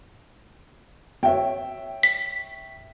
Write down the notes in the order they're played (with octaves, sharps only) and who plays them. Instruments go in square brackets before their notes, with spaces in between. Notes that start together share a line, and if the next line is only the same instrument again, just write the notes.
[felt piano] C#5 E5 G5
[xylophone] B6